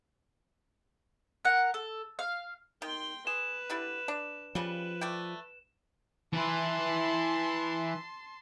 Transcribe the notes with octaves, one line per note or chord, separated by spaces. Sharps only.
A#4 F#5
A4
F5
D#3 G5 C6
G#4 B4 E7
D3 G3 E4
D4
C#3 F3 G3 B4
A3 D5 G5
E3 B4 A5 C6